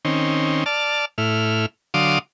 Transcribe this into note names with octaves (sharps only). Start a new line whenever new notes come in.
D#3 C4 C#4
D5 A5 F6
A2 E4 F6
D3 F#3 F5 C6 D6 D#6